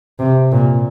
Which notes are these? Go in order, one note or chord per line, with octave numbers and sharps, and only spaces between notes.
C3
A#2